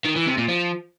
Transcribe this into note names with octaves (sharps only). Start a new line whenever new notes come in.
D#3
E3
C3
A#2
F3